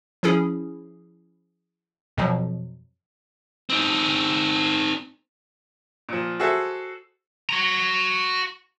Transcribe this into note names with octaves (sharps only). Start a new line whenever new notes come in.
F3 C#4 E4 G#4
F2 B2 F3 F#3
C4 D#4
A#2 F3
F#4 G#4 A4 C5 E5
F#4 A#5